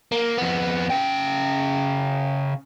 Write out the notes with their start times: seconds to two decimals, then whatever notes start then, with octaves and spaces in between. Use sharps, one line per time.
0.12 A#3
0.37 F2 B3
0.90 C#3 G5